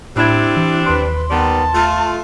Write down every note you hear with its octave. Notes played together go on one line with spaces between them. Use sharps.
A2 G3 C4 D4 E4 B5 G#6
E3
D#2 B4 C6
D#3 G3 B3 A5
A3 F4